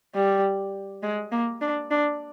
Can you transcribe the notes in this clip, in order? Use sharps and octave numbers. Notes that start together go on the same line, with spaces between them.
G3
G#3
A#3
D4
D4